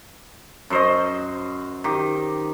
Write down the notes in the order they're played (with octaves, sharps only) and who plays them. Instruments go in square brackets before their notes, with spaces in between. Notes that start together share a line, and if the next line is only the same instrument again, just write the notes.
[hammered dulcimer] F#2 C5 D#5
D#3 G4